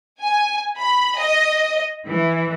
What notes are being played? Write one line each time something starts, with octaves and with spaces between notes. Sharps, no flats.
G#5
B5
D#5
E3